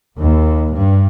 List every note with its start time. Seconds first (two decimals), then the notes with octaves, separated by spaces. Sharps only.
0.17 D#2
0.74 G2